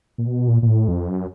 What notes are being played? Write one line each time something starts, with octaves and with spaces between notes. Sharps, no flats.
A#2
B2
A#2
A#2
A2
F2
F#2